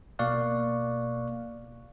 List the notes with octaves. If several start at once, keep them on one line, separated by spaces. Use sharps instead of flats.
B2 A#3 D5 F5 C#6 F#6